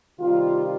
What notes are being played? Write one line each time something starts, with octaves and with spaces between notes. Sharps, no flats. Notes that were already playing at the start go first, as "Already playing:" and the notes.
C3 D#3 G3 F4